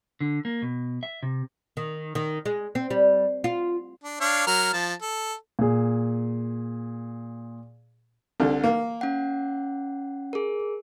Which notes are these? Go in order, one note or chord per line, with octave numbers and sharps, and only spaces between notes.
D3
A#3
B2
E5
C3
D#3
D#3
G#3
C4
G3
F4
D4
D4 C#5 F5
F#3 A#4 F6
F3 A5
A4
A#2 G#4
C2 D3
A#3
C#4 F#5
G#4 A#4